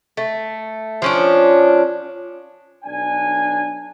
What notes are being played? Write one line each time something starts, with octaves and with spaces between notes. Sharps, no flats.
A3
F3 C#4 D4
B1 D4 G#5